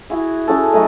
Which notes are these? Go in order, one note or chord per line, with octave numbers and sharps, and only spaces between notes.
E4 F#4 G#4
C#4 F#4 G#4 A4
F#3 A3 D#5 E5